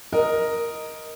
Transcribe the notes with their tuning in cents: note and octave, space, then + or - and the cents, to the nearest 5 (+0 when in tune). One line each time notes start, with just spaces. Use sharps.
A#4 +0 D#5 +0